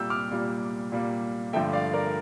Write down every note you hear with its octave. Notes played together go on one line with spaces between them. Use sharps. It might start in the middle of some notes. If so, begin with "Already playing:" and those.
Already playing: A#2 G3 A#3 G5 E6 G6
D6 F6
A#2 G3 A#3
A#2 G3 A#3
G2 D3 F3 A3 E5 G5
D5 F5
A#4 D5